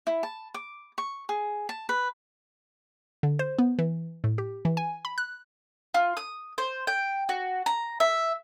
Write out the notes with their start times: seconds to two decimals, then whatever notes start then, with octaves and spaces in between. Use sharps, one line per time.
0.07 E4
0.23 A5
0.54 D6
0.98 C#6
1.29 G#4
1.69 A5
1.89 B4
3.23 D3
3.39 C5
3.59 B3
3.79 E3
4.24 A2
4.38 G4
4.65 E3
4.77 G#5
5.05 B5
5.18 F#6
5.94 F4
6.17 D#6
6.58 C5
6.87 G5
7.29 F#4
7.66 A#5
8.00 E5